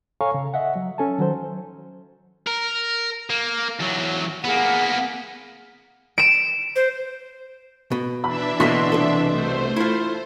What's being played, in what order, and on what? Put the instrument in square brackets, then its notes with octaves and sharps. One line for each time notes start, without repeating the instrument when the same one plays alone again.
[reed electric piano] A4 C#5 F5 G#5 A#5 C#6
C#3
D#5 E5 F#5
F#3
C#4 A4 G#5 A5
D#3 F#3 C5
[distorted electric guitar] A#4
A#3
E2 F#3
[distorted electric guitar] A#3 B3 [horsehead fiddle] G#4 F#5
[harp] D7 E7
[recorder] C5
[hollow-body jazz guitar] B2
[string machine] E3 D4 E5 [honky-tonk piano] B5
[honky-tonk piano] B2 C6 B6 [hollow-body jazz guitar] D3 A#3 F#4
[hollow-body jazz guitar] C2 A4
[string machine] A3 C5
[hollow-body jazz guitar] E4 F4